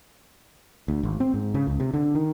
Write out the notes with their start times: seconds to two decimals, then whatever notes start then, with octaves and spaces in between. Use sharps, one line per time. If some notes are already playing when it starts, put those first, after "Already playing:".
0.88 D2
1.03 G#1
1.20 C4
1.34 G#2
1.54 C#3
1.67 C#2
1.80 C3
1.94 D3
2.15 D#3